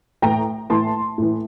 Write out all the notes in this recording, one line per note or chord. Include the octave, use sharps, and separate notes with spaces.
A2 E3 G5 A#5
A2 E3 A5 C6
A2 E3